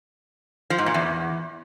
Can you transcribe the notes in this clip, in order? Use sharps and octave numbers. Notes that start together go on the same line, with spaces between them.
F3
G#2
A#2
E2